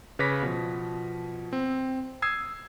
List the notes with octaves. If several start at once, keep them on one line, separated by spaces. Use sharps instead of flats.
C#3 B4 C#5 D6 A#6 B6
B2 F3
C4
D#6 E6 G#6 C7